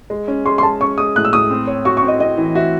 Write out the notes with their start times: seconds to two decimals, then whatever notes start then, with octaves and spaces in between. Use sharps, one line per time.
0.10 G#3
0.28 C#4
0.45 G#3 C6
0.58 C6
0.63 G#3 A5
0.81 C#4 C#6
0.98 G#3 D#6
1.16 A2 F#6
1.25 E6
1.33 A2 D#6
1.50 C4
1.67 C#5
1.85 F#4 C#6
1.97 C#6
2.03 C4
2.08 D#5
2.20 C4 D#5
2.37 E3
2.55 F#4 E5